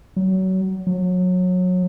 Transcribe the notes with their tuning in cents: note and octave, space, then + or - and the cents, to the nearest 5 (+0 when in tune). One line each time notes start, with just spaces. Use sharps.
F#3 +25
F#3 -25